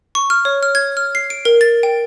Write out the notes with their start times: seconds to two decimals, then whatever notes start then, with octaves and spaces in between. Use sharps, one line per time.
0.15 C#6
0.30 F6
0.45 C#5
0.63 F6
0.75 G#6
0.97 F6
1.15 C7
1.30 D7
1.45 A#4
1.61 A6
1.83 G5